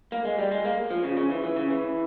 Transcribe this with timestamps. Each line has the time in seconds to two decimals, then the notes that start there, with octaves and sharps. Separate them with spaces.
0.12 A#3
0.25 G#3
0.39 G3
0.51 G#3
0.65 A#3
0.91 F3
1.04 C#3
1.17 C#3
1.30 E3
1.44 E3
1.56 C#3
1.70 E3